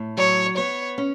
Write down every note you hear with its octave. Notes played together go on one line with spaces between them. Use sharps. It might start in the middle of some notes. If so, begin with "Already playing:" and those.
Already playing: A2
F#3 C#5
B3 C#5
C#4